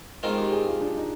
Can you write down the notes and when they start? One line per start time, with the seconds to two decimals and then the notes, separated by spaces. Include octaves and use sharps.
0.23 D#3 G#3 C4 F4 A#4
0.38 G4
0.52 G#4
0.67 F4
0.81 D4
0.97 D#4